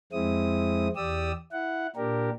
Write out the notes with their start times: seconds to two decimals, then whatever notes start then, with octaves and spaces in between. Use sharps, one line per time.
0.12 F2 G#3 C4 E4 D#6
0.96 E2 G4 D5 D#6 E6
1.52 E4 F#5
1.96 A#2 D4 G4 A#4